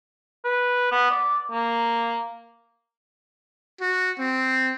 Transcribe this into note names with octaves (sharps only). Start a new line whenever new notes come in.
B4
B3
D5
A#3
F#4
C4